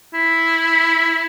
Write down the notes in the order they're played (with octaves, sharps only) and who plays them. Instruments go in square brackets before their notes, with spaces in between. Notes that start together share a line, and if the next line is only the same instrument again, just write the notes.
[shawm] E4